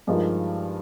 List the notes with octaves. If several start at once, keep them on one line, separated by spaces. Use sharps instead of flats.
G2 F3 G#3 D#4 A#4